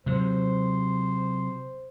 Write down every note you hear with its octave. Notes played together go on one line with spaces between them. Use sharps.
C3 F#3 C5